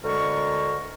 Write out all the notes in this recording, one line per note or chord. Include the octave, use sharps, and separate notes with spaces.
D2 D3 G#3 A#4 C#6